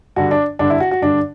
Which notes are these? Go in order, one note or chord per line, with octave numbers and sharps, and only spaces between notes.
G2 D3 F#4
D4
G2 D3 D4
E4
F#4
F#4
G2 D3 D4